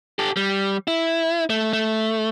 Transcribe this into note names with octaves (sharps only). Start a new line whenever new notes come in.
G4 A4
G3
E4
A3
A3